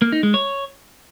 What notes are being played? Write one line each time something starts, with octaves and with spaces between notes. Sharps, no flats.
A#3
D#4
G#3
C#5